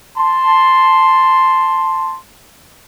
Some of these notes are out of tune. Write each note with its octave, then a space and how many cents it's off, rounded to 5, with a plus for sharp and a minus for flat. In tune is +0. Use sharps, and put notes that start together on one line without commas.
A5 +0 C6 +0